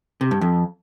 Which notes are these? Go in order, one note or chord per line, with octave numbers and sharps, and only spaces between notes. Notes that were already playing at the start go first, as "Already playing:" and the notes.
C3
G2
F2